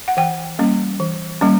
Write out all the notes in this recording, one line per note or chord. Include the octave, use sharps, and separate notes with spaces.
F#5
E3 G5
G3 A#3 C#4
E3
G3 A#3 C#4